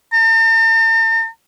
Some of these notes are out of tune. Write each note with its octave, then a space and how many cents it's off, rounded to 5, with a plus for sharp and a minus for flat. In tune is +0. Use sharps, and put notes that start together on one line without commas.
A5 +45